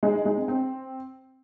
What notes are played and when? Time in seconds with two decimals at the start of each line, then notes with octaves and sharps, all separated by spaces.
0.03 G#3
0.14 D#4
0.25 G#3
0.37 C4
0.48 C4